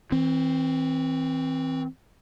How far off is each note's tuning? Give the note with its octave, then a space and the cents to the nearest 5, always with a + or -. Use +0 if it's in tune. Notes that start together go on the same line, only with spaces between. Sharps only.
E3 -35 C4 +0